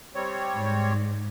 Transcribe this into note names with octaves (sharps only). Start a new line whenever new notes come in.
G3 C4 C#5
G#2